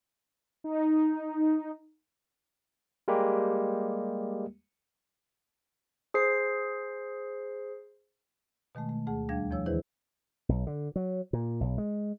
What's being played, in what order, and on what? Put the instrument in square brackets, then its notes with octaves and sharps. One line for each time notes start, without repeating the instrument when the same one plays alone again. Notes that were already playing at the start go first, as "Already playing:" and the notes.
[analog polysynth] D#4
[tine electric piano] G3 G#3 A#3 G4
[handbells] G#4 C5 C7
[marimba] B2 D#3 G#3 A3
A3
D2 A3 G#4 F#5
D#2 G3 D4 F5 G#6
E2 F3 C#5 E6
D#3 E3 E4 G#4 B4 C5
[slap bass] B1
D3
F#3
A#2
B1
G#3